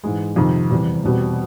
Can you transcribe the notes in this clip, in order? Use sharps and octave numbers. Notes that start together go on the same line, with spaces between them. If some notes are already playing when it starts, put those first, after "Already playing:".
G#2 E3 G#3
F2 C3 D#3
E2 C3 E3 G3
E2 B2 G3 C4